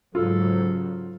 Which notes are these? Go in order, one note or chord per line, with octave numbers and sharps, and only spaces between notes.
G#2 C#3 F#3 F4 A4